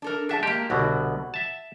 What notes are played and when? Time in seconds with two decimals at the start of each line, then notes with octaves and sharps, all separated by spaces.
0.02 D4 A4 A#4
0.29 D4 G#4 E5 F#5 A5
0.43 G#3 A#3 G4
0.70 C2 B2 D3 F#4
1.34 E5 A5